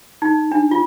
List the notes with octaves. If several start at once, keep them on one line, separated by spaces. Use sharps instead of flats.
D#4
D4
F4